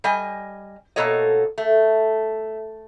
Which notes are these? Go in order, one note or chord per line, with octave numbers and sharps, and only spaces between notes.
G3 D#5 G#5
B2 A#3 A4 C#5 D#5
A3